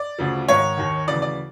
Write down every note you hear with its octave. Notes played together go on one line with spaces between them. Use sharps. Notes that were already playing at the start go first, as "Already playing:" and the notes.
Already playing: D5
D2 C#3 F3
G#2 D#3 C#5
D#2 D#3
D2 C#3 E3 D5
D5